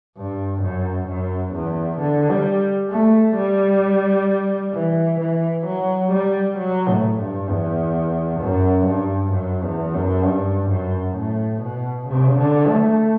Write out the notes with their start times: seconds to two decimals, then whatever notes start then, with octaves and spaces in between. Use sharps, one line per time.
0.17 G2
0.63 F#2
1.08 F#2
1.54 E2
2.00 D3
2.30 G3
2.91 A3
3.37 G3
4.75 E3
5.21 E3
5.67 F#3
6.13 G3
6.58 F#3
6.89 A2
7.19 G2
7.50 E2
8.41 F#2
8.87 G2
9.33 F#2
9.63 E2
9.94 F#2
10.25 G2
10.70 F#2
11.17 A2
11.62 B2
12.08 C#3
12.39 D3
12.69 A3